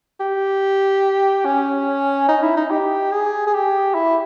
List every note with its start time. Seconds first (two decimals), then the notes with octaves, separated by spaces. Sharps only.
0.20 G4
1.45 C#4
2.28 D#4
2.42 E4
2.57 D#4
2.70 G4
3.11 G#4
3.47 G#4
3.53 G4
3.94 E4